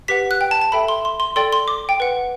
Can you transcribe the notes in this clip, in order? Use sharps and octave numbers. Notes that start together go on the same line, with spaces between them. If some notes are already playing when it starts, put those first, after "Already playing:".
G4 B4 F#5 B6
F#6
G5
A5
A5
A4 E5 G5 B5
C6
C6
C6
A4 D5 G5 C6
C6
D6
G5
B4 F#5